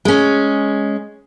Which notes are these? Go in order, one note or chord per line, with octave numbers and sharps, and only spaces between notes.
G#3 C#4